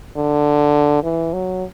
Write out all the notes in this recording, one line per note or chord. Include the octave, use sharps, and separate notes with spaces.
D3
E3
F#3